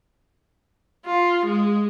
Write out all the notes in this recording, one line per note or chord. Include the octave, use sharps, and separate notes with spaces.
F4
G#3